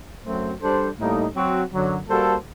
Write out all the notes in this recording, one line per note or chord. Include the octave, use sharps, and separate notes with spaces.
F#2 F#3 A3 C4
G3 D4 A4 C5
A2 G3 A#3 D#4 A4
F#3 C4 F#4
F#2 D3 F#3
G3 A#3 F#4 A4 C5